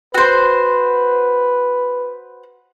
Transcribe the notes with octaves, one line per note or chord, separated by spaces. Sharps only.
F#4 B4 C5